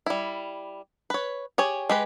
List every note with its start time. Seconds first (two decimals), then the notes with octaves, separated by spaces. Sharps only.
0.06 G3 E4
1.10 B4 C#5
1.58 G4 G#4 C#5
1.89 G#3 G4 B4